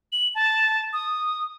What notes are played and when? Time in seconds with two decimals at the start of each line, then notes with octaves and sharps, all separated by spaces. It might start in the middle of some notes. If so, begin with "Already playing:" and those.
0.12 F#7
0.35 A5
0.93 D#6